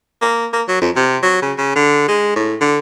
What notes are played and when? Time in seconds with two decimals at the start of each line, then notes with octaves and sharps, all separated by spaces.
0.22 A#3
0.53 A#3
0.68 F#3
0.81 F2
0.96 C3
1.23 F#3
1.42 C#3
1.58 C#3
1.76 D3
2.08 G#3
2.36 A2
2.61 D3